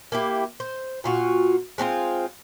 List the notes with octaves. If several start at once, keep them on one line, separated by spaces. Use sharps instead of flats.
A#3 E4 G4
C5
A#2 F4 F#4
G#3 C4 D4 F4